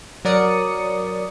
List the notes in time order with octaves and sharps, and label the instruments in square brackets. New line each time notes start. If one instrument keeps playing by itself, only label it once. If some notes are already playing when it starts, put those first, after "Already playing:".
[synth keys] F#3 A#4 D5 D#6 C#7